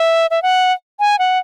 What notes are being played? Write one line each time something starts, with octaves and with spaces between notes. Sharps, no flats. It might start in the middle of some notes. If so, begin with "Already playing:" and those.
Already playing: E5
E5
F#5
G#5
F#5